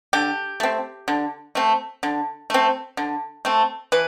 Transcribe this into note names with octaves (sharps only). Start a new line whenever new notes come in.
D3 G4
A3 C4
D3
A3 C4
D3
A3 C4
D3
A3 C4
E3 B4